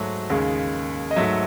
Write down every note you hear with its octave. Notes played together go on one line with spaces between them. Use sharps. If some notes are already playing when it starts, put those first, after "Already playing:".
Already playing: G#2 F#3 A3 F#4
D#2 C#3 G#3
D#5
G#2 F#3 A3 E5